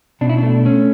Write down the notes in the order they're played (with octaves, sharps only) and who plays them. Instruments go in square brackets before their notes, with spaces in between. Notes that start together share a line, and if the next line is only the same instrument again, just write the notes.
[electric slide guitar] B2 D4
E4
A3 D4
A3 C#4